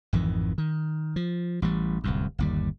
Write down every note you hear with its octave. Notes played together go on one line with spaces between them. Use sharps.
G#1 F2 D#3 E3
D#3
F3
A1 E3 G3
D1 C2 F#2
G1 D#2 G3